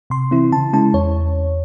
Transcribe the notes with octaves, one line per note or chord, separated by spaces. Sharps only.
C3 C6
E3 C4 E4
C#3 A5
G#3 C#4 E4 A5
E2 C#5